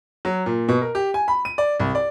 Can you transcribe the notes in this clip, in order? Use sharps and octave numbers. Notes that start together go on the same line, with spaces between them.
F#3
A#2
B2
A#4
G4
G#5
B5
D#7
D5
C2
D5